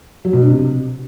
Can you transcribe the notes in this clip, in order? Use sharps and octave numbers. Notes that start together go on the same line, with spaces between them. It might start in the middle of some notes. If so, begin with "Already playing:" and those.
F#3
B2
D4
C3